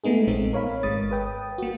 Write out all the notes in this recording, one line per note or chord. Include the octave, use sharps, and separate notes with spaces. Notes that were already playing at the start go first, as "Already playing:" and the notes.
G#3 A3 B3 D#4 G#4
A#1 A#2 G#3 C4 D#4
A#4 C#5 F5 B5
G#1 G#3 D#6 A6
B4 G5 D#6
A#3 F#4